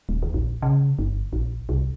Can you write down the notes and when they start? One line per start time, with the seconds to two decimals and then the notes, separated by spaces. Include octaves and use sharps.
0.09 D#1
0.22 D#2
0.34 A#1
0.62 C#3
0.99 G1
1.33 A#1
1.69 C2